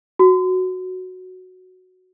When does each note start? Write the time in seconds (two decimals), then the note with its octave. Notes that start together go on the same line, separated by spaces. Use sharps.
0.19 F#4